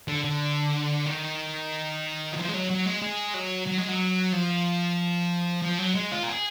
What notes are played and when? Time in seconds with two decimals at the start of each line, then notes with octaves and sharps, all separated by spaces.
0.08 D3
0.24 D3
1.06 D#3
2.32 F#3
2.36 F3
2.48 G#3
2.53 F#3
2.69 F#3
2.85 G#3
3.02 G#3
3.34 F#3
3.67 F#3
3.78 G#3
3.88 F#3
4.32 F3
5.63 F3
5.79 F#3
5.95 G#3
6.12 F4
6.23 A#4
6.28 G#4